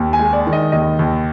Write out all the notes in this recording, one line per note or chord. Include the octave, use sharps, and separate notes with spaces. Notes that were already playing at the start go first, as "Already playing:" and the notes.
Already playing: D#2
G#5
G#3
D5
D#3
D#5
D#2 D#5
D#2